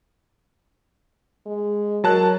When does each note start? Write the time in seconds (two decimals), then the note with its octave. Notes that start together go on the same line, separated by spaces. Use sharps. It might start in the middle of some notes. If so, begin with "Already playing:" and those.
1.46 G#3
2.04 F#3 A#4 A5 F#6